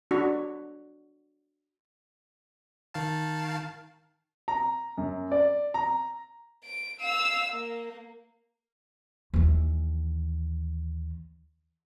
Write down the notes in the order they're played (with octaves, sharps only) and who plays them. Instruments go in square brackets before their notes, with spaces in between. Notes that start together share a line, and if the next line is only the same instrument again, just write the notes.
[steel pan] D4 F#4
[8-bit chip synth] D#3 F5 A5
[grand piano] A#5
F#2
D5
A#5
[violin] D7
F5 E6
A#3
[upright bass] D#2 E3